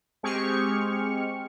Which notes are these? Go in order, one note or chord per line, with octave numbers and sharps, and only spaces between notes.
G#3 C4 G4 G#4 C#6 F6